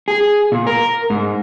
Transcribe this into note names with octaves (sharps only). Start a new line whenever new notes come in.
G#4
A#2
A#4
G#2